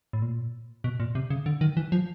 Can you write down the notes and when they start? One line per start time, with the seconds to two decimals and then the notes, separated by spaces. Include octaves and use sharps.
0.13 A2
0.22 A#2
0.84 B2
1.00 A#2
1.15 C3
1.30 C#3
1.46 D3
1.61 D#3
1.77 E3
1.92 F3